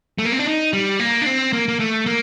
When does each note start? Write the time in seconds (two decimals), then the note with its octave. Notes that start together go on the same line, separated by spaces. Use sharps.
0.19 A3
0.25 A#3
0.32 C4
0.39 D4
0.46 D#4
0.73 G3
1.00 A#3
1.22 D4
1.26 C4
1.53 A#3
1.68 A#3
1.79 A3
2.06 A#3